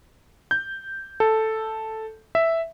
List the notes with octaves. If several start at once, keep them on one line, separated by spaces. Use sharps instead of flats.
G6
A4
E5